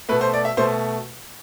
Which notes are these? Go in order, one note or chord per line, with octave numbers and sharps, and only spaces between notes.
B2 A3 B4
C5
D5
E5
B2 A3 C5